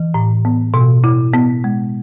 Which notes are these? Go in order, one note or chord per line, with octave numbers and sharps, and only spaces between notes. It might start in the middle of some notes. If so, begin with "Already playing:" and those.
Already playing: E3
A2
B3
B2
E4
B3
G#3